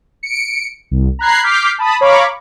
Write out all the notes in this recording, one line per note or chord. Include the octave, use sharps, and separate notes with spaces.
C#7 D7
C2
A#5 B5 F#6 G#6 C7
D6 F6 G6 B6 C7
A5 B5 D#6
C#5 F5 A#5 B5 C#6 D6